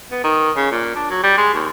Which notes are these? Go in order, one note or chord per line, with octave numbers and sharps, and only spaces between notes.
B3
D#3
C#3
A#2
D4
F#3
G3
G#3
D#2